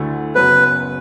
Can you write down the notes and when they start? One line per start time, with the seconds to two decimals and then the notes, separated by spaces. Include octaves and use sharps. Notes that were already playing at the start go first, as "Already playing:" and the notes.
Already playing: D2 D3 A3 E4
0.35 F#1 F#2 F#3 B3 B4